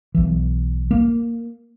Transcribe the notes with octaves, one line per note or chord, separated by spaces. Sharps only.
B1 E3
A#3